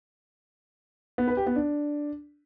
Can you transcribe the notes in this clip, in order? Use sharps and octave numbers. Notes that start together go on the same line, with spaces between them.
B3
B4
G4
B3
D4